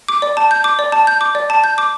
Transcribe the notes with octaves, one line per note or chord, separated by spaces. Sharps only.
D6
D5
A5
G6
D6
D5
A5
G6
D6
D5
A5
G6
D6